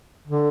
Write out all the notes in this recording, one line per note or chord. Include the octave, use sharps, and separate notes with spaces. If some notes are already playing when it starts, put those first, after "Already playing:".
D3